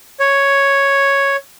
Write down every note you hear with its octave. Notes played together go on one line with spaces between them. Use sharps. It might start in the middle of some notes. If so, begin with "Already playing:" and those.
C#5